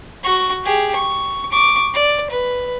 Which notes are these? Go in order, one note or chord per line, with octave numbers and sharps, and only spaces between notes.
F#4 C#6
G4 G#4
C#6
C#6 D6
D5
B4